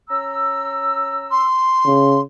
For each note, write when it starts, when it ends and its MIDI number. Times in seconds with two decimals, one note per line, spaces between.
0.10 1.46 61
0.10 1.46 82
0.10 1.46 88
1.31 2.20 84
1.85 2.21 49